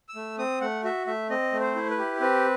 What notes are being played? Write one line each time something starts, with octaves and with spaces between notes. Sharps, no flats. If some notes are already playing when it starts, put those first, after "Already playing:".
E6
A3
C4 D#6
A3 F#5
F#4 E5
A3 E5
C4 D#5
A3
C5
E4
B4
G4
C4 B4